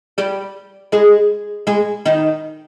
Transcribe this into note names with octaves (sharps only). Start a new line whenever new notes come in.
G3 G4
G#3 G#4
G#3 G#4
D#3 D#4